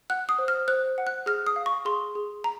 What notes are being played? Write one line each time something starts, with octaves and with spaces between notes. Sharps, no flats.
F#5 F#6
D#6
C5
F6
C5 F#6
F#5
F#6
G#4 F6
D#6
F5
C#6
G#4 C6
G#4
A#5